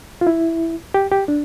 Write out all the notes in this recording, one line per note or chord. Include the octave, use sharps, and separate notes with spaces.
F4
E4
G4
G4
D4